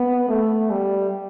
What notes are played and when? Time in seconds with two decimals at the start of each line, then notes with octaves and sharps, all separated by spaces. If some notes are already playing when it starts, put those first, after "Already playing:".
Already playing: B3
0.29 A3
0.70 G3